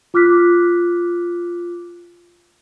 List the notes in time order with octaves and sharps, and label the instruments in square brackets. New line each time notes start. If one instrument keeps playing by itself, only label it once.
[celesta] F4 D6 F6 F#6 B6